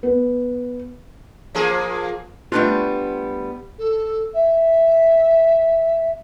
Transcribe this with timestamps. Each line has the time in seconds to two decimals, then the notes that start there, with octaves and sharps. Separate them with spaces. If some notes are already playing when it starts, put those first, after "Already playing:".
0.03 B3
1.55 F3 A#3 G#4
2.52 G3 A3 B3 C#4 D4 F4
3.79 A4
4.34 E5